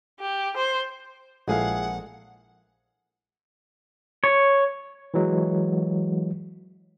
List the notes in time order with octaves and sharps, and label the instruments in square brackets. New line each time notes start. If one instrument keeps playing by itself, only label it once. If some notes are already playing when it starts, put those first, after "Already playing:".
[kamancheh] G4
C5
[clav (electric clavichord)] A#1 [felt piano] F3 G#3 A4 [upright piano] E4 G#4 F5 [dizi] F#5
[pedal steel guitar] C#5
[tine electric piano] E3 F#3 G#3